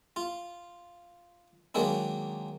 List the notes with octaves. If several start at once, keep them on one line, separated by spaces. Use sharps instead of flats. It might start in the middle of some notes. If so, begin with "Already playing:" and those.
F4
D#3 F#3 G#3 A#3 D4